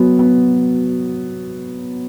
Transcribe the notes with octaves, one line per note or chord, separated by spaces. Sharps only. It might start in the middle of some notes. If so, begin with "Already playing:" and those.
Already playing: F#3 B3
B3